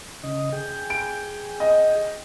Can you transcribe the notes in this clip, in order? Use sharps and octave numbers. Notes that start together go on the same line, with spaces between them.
C#3 D#5
G#4 G5
D7
D#5